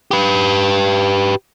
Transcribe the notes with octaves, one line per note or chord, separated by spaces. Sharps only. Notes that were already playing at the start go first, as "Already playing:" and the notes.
G4 B4